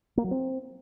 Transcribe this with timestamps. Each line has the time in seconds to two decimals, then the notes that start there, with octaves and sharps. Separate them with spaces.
0.17 A#3
0.24 F#3
0.31 C4